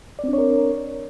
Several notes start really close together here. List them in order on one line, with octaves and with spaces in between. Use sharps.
D5 C4 D4 C#5 A#4